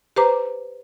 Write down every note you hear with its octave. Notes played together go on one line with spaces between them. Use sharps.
G4 B4 C5 A#5 D6